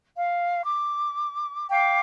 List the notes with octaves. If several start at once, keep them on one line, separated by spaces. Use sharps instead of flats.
F5
D6
F5 G5 D6